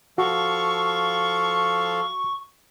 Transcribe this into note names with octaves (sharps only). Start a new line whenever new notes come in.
F3 F#4 A4 F5 C#6